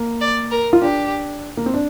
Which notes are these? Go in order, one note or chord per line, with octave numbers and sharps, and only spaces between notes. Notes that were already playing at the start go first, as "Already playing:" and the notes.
Already playing: A#3
D5
A#4
F4
D4 G4
A#3
C4
D4